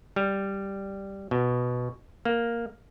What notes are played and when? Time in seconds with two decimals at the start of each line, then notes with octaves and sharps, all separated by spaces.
0.16 G3
1.31 B2
2.25 A#3